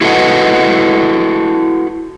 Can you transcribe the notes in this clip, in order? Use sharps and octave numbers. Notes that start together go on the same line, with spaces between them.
E4 F#4 A4 B4 D#5 F#5